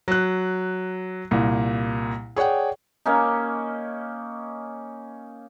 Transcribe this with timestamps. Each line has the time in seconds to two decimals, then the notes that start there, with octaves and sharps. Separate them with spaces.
0.08 F#3 F#6
1.31 C2 A#2
2.36 G#4 C#5 D5 F#5 G5
3.06 A#3 C#4 D#4